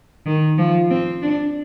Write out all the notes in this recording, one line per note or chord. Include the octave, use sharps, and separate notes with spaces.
D#3
F3
C4
D4